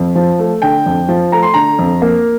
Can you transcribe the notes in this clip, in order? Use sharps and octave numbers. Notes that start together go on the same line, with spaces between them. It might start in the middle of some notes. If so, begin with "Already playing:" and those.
Already playing: F2
F3
A3
D3 G5
F2
F3
A3 A#5
C6
D3 A#5
F2
A#3